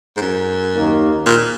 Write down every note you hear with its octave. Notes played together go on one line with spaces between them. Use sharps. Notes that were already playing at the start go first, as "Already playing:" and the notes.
G#2
F#2
D#2 D#3 A#3 D#4
A#2